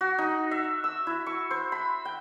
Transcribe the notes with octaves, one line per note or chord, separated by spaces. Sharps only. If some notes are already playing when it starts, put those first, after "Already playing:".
F#4
D#4
E5
E6
E4
C#6
C5
B5
G5